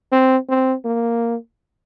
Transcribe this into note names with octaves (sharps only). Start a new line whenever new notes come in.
C4
C4
A#3